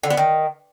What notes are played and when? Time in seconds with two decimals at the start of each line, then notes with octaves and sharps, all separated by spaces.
0.03 D3
0.10 B3
0.17 D#3